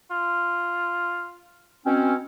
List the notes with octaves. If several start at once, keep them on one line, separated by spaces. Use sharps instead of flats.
F4
B2 C4 C#4